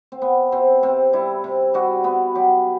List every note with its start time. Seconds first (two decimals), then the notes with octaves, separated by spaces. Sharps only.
0.12 C4
0.22 B3
0.52 C3 C4
0.83 C3 C4
1.13 G3 E4
1.44 C3
1.74 G3 F#4
2.04 B3
2.35 F#3 G4